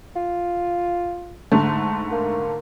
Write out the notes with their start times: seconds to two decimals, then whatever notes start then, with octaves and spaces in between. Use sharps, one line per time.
0.16 F4
1.52 G#2 D3 A3
2.12 A#3